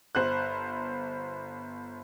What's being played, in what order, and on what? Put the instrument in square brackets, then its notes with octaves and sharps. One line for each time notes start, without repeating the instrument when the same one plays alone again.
[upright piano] G1 C5 F#6